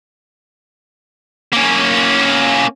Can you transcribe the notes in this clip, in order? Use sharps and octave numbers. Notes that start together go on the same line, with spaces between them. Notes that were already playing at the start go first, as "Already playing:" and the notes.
A#3 C#4